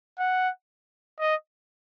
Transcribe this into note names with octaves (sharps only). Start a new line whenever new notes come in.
F#5
D#5